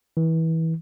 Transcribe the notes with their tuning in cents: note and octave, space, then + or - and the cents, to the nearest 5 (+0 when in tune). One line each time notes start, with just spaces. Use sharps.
E3 -25